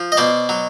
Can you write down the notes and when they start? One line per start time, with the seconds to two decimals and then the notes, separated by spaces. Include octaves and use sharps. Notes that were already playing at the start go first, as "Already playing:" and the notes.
Already playing: F3
0.12 D#5
0.17 B2 C5 D5
0.49 F#3